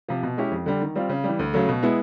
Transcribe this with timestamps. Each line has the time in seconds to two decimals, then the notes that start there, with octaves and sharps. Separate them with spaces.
0.09 C3 F3
0.23 B2
0.37 G#3 C#4 E4 G4
0.52 F2
0.66 D3 G3
0.81 D#3
0.96 G3 C4 F4
1.09 C#3
1.24 E3 G3
1.39 D2
1.53 C#3 F#3 A3
1.69 B2
1.83 G#3 B3 E4